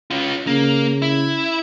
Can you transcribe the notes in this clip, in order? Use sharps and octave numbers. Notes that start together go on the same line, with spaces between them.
C#4 F4
C#3 A#3
E4